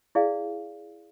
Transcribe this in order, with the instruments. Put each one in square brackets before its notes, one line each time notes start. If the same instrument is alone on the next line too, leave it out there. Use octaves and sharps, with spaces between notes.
[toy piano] E4 G#4 D5 F5